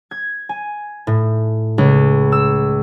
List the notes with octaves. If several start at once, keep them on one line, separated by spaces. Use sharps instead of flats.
G#6
G#5
A2
C#2
E6